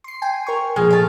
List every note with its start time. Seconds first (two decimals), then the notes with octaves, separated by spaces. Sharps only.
0.04 C6 C7
0.22 G5 G#5
0.47 A#4 C#6
0.76 A#2 F3 G#3 F6
0.90 A3 A5